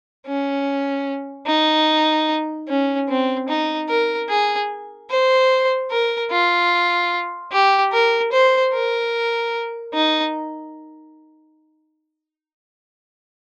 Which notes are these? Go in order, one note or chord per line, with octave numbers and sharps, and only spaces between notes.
C#4
D#4
C#4
C4
D#4
A#4
G#4
C5
A#4
F4
G4
A#4
C5
A#4
D#4